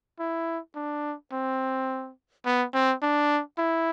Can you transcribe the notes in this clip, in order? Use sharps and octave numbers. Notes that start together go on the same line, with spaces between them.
E4
D4
C4
B3
C4
D4
E4